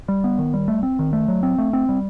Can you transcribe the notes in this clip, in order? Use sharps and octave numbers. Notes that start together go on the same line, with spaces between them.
G3
B3
D#3
G3
A3
C4
D#3
A3
F#3
C4
A3
C4
G3